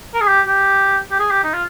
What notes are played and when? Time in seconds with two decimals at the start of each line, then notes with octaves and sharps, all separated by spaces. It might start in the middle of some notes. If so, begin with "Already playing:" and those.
0.15 A#4
0.21 G#4
0.28 G4
0.47 G4
1.11 G4
1.19 G#4
1.31 G4
1.43 D#4
1.54 F4